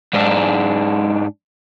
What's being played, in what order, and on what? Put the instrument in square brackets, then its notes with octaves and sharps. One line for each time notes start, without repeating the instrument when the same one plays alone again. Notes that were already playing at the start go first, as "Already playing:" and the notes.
[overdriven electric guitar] G#2 D4